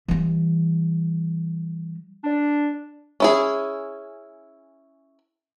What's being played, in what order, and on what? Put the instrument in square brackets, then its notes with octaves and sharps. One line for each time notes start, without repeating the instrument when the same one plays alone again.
[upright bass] E3 G3
[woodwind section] D4
[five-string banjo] C#4 E4 G#4